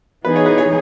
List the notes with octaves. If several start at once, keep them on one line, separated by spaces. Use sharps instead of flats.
E3 B3 D#4 G#4 B4
C#5
B4
C#5